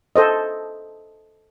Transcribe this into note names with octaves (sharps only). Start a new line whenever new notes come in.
A4 C5 D#5